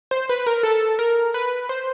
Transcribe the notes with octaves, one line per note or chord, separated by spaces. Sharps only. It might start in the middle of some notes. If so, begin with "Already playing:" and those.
C5
B4
A#4
A4
A#4
B4
C5